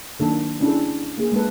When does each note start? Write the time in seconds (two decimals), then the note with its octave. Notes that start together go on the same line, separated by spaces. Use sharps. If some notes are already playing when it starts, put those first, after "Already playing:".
0.20 D#3 F#3 A#3 D4 A4
0.61 C#4 D4 E4 G#4 A4
1.18 A#3 G#4
1.32 G#3 A#3 A4 B4